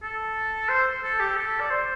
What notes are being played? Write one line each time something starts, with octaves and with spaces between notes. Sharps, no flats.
A4
C5
A4
G4
A4
D5
C5